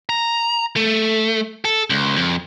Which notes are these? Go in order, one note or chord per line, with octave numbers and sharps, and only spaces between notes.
A#5
A3
A4
C#2
F2